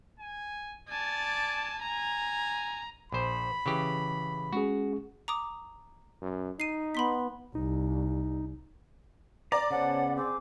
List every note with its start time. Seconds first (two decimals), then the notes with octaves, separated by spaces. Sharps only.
0.20 G#5
0.89 D5 G#5 A5
1.82 G#5 A#5
3.12 A#1 C5 B5
3.66 C#3 E3 G4
4.53 G#3 C#4 F#4 G#4
5.28 A#5 D6 D#6
6.22 F#2
6.60 D#4 C7 D#7
6.95 B3 B5 C6 B6
7.55 C2 D#4
9.52 D5 A#5
9.70 C#3 B3 C5 C#5 F#5 A5
10.16 C4 G#4 G#5 D6